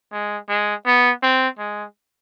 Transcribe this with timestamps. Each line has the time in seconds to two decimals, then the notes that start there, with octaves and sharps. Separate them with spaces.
0.12 G#3
0.49 G#3
0.86 B3
1.22 C4
1.58 G#3